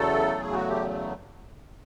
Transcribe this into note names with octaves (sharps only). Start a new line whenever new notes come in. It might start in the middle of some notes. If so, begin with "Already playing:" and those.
Already playing: E2 C#3 F#3 A3 A4
G#4
F#4
G4